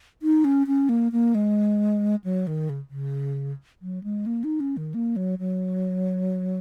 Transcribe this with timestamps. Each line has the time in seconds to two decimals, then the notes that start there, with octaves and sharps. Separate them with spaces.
0.22 D#4
0.45 C#4
0.67 C#4
0.89 A#3
1.12 A#3
1.35 G#3
2.24 F#3
2.47 D#3
2.69 C#3
2.89 C#3
3.82 F#3
4.04 G#3
4.26 A#3
4.44 D#4
4.60 C#4
4.77 D#3
4.94 A#3
5.16 F#3
5.39 F#3